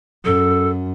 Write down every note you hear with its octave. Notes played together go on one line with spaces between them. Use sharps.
F#2 A4